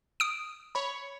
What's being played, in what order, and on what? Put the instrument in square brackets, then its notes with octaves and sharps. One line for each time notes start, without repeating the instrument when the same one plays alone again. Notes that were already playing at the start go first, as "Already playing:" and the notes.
[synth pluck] D#6 D7
[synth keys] C#5 B5